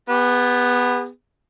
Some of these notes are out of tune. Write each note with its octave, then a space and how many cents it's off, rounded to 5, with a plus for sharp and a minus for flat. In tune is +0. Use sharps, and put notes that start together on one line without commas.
B3 +0 G#4 -45